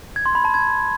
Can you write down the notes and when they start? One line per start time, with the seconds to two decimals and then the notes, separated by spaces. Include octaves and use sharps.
0.16 G#6
0.26 C6
0.35 B5
0.45 A5
0.54 G#6